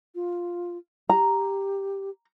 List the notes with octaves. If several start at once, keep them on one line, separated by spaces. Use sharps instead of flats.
F4
G4 A#5